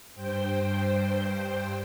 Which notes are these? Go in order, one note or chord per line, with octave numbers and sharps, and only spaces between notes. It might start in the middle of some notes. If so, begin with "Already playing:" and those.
G2 C5 G5